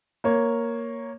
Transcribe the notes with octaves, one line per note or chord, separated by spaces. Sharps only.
A#3 C#5